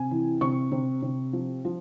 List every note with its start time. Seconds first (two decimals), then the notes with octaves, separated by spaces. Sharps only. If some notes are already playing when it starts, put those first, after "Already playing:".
Already playing: C3 G#5
0.11 E3
0.41 C3 C#6
0.72 C3
1.02 C3
1.33 F3
1.65 F3